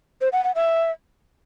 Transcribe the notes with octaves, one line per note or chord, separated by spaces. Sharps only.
C5
F#5
F#5
E5